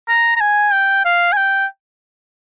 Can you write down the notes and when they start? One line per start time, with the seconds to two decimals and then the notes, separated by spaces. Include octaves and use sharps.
0.09 A#5
0.37 A#5
0.41 G#5
0.73 G5
1.05 F5
1.32 G#5
1.37 G5